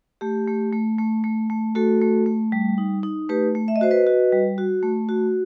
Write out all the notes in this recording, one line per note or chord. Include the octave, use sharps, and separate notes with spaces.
A3 G4
A3
A3
A3
A3
A3
A3 F#4 A4
A3
A3
G3
D#4
D#4
A3 G4 B4
A3
E5
D#5
F#4 C5
B4 D#5
F#4
G3
F#4
A3
F#4